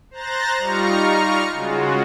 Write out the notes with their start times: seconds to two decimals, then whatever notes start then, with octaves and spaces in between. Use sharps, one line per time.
0.11 C5 A#5 F#6 A6 A#6
0.58 G3 D#4 F4 A#5 C#6 F6
1.53 C#3 G#3 F4 F#4